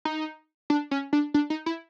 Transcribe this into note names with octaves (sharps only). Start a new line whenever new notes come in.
D#4
D4
C#4
D4
D4
D#4
E4